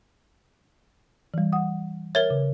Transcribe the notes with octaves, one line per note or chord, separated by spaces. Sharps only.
E3 G3
F#5 D#6
A#4 C#5 E5 G#6 A6
C#3